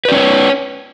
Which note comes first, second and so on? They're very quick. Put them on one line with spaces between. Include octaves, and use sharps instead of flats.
B4 D5 C#4 C#5